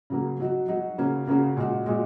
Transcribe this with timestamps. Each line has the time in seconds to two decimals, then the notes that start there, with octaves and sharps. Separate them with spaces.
0.10 C#3 F#3 A#3
0.40 F#3 D#4 F#4
0.68 F#3 D#4 F#4
0.98 C#3 A#3 C#4 F#4
1.27 C#3 A#3 C#4 F#4
1.57 A#2 G#3 F#4
1.86 A#2 G#3 F#4